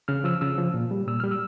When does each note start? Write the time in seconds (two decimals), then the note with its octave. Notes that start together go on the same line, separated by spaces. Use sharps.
0.08 C#3 F6
0.24 F3 E6
0.41 C#3 E6
0.58 F3
0.74 A#2
0.91 G3
1.07 A#2 E6
1.20 G3 F6
1.31 E6